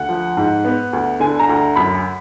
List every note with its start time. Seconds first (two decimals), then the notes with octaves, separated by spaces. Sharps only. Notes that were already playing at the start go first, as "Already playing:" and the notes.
Already playing: D2 F#5
0.09 F3
0.37 G#2
0.65 B3
0.93 D2
1.20 D3 G#5
1.39 A#5
1.49 D2
1.57 A#5
1.76 F#2 B5